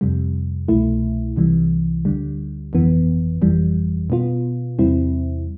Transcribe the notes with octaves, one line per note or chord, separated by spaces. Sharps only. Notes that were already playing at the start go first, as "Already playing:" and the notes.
F2 C3 G3
C2 B2 A3 E4
C2 C3 E3 G3
D2 D3 G3
G1 F2 E3 B3
G1 F2 E3 G3
B2 B3 F4
E2 C3 G3 C4 E4